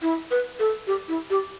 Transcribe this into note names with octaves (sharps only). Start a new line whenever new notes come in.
E4
B4
A4
G4
E4
G4